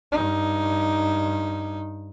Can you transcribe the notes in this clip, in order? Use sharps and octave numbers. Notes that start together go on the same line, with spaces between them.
G2 D#4